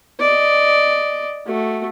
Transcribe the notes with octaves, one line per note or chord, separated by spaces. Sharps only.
D5 D#5
A3 F#4